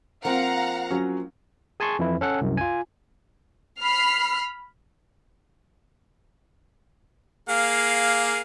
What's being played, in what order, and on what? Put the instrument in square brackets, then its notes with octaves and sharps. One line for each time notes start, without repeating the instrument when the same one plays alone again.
[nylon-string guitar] F3 A#3 C4 [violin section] F5 F#5 A#5
[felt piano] F#3 C#4
[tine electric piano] G#4 G#5 A5 C6 C#6
F2 E3 E4
C#4 A4 F#5
C2 F#2
F4 G#5
[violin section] B5 F6 C7
[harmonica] A#3 G#4 F5